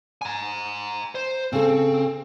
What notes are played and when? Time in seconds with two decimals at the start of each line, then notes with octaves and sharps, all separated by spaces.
0.22 G#5 A#5
1.15 C5
1.53 C#3 C4 A4